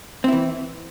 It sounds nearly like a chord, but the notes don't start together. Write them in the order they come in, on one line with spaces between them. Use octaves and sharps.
C4 E4 E3